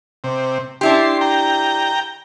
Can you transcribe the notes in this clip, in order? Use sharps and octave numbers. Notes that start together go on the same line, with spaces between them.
C3
D4 E4 G4 C6
G5 A#5